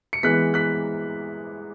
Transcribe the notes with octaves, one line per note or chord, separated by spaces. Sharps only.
C#7
E3 G#3 B3 F#6 B6
F#6 B6